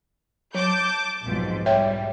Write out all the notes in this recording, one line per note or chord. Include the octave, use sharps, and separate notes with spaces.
F#3 A5 D6 G6
B1 F2 G#2
G#2 G3 C#5 E5 G5